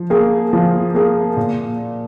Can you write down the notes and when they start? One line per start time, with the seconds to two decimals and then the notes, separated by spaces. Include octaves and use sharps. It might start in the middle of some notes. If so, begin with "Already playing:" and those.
Already playing: F3
0.10 A#3 G#4
0.53 F3
0.94 A#3 G#4
1.37 A#2